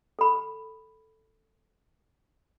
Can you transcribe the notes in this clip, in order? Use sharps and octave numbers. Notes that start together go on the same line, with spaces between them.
A4 B5